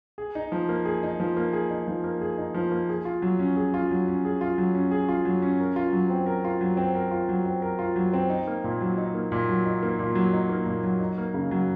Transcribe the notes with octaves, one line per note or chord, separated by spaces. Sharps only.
G#4
D#4
F3
A#3
G#4
D#4
F3
A#3
G#4
D#4
F3
A#3
G#4
D#4
F3
A#3
G#4
F4
F#3
C#4
G#4
F4
F#3
C#4
G#4
F4
F#3
C#4
G#4
F4
F#3
C#4
A#4
F4
F#3
C4
A#4
F4
F#3
C4
A#4
F4
F#3
C4
A#4
F4
F#3
C4
D#4
A#3
A#2
F#3
D#4
A#3
A#2
F#3
D#4
A#3
A#2
F#3
D#4
A#3
A#2
F#3
D#4
A#3
C#3
F#3